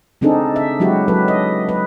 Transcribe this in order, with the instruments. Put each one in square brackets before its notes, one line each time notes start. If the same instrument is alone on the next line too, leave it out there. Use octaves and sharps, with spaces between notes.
[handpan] C#3 C4 D4 D#4 G#4 A4
E5
F#3 G#3 E4 F#4 G4
F#3 A4 B4
D#5
B4